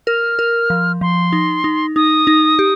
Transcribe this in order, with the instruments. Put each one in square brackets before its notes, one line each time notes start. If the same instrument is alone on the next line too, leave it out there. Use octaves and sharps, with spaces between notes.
[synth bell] A#4 [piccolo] F6
[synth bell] A#4
F3
[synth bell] F3 [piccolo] C6
[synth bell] D#4
D#4
[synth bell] D#4 [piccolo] D#6
[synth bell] D#4
G4